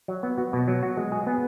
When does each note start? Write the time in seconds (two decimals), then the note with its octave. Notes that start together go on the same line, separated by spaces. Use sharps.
0.08 F#3
0.23 B3
0.38 F#4
0.53 B2
0.68 F#3
0.83 F#4
0.97 G#3
1.12 G#4
1.27 B3